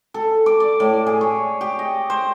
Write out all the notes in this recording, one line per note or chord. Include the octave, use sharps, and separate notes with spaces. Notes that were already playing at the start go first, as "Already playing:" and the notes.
A4
D6
D5
A2
G#4
C#5
G4
D#5
C5